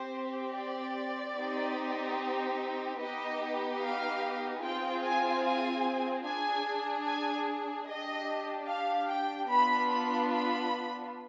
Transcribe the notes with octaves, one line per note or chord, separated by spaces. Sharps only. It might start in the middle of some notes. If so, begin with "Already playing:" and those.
Already playing: C4 G4 C5
D5
C4 D#4 G4
B3 D#4 G4 D#5
F5
C4 F4 G#4 G5
G#5
G#5
D4 G#4 G#5
G#5
D4 G4 D#5
F5
G5
B3 D4 F4 B5
B5
B5